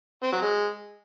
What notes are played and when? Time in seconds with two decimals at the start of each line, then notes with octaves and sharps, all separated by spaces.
0.23 C4
0.32 F#3
0.42 G#3